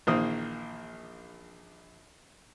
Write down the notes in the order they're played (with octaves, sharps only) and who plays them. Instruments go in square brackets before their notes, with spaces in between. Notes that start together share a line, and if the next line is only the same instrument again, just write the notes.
[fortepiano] A#1 D#3 E3 A#3 C5 D#6